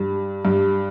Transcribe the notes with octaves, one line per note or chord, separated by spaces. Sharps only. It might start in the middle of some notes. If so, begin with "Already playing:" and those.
Already playing: G2
G2